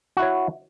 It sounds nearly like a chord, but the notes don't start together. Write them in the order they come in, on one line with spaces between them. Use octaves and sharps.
F#4 E4 C#5